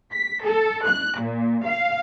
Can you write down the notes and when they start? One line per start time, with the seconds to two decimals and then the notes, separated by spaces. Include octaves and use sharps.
0.13 B6
0.44 A4
0.89 F#6
1.22 A#2
1.67 F5